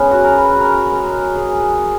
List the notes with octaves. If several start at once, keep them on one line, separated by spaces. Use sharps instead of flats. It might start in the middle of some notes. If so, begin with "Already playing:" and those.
Already playing: C#3 E3 G#3 B3 C#4
F#4
A#4
B4
A#4
B2 G#3
G#4